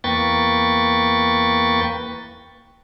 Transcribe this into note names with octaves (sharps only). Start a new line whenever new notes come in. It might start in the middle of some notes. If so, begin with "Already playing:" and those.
E2 A#3 B4 G5 C#6 A6